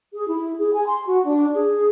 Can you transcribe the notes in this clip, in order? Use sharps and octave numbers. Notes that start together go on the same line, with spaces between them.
G#4
E4
G#4
G#5
C6
F#4
D4
G#4